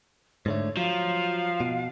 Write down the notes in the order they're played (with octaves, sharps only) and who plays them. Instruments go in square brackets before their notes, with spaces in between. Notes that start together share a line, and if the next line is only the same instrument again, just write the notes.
[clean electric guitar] G#2 D3 A3 [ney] C#5
[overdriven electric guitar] F3 [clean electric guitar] F#3 [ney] F5
[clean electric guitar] B2